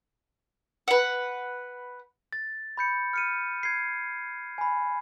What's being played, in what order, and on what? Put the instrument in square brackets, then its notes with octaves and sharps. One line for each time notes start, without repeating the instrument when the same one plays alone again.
[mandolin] B4 F#5
[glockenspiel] A6
B5 G6 C#7
F6 C#7 D#7
G#6 C7
G#5 B5